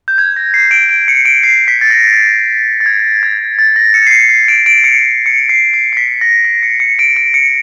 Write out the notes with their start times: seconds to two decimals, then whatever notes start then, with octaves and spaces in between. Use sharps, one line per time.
0.08 G6
0.18 G#6
0.36 A#6
0.54 C7
0.71 D7
0.89 D7
1.08 C#7
1.25 D7
1.44 C7
1.68 B6
1.81 A6
1.91 A#6
2.80 A6
2.86 G#6
3.23 G#6
3.59 A6
3.76 A#6
3.94 C#7
4.07 C7
4.11 C#7
4.29 C7
4.48 D7
4.66 D7
4.84 C#7
5.26 C#7
5.49 C7
5.74 C7
5.93 C7
5.97 B6
6.21 A#6
6.45 A#6
6.63 C#7
6.80 C#7
6.99 D7
7.16 D7
7.34 C#7